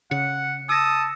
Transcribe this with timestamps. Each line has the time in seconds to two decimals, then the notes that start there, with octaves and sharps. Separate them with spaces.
0.11 C#3 F#5 C#7
0.69 A5 D#6 E6 A#6